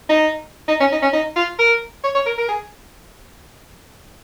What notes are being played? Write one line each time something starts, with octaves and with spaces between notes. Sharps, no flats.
D#4
D#4
C#4
D#4
C#4
D#4
F4
A#4
C#5
C#5
A#4
A#4
G#4